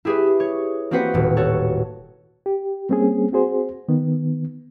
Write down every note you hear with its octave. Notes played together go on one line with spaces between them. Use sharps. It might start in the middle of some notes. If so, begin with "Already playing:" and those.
E4 G4 G#4 B4 E5
C#5
A#3 C4 F#4 B4 C5 F#5
D#1 A2
F#4 A4 C#5
G4
G3 A#3 C4 C#4 G#4
C4 F#4 G#4 C5
D#3 B3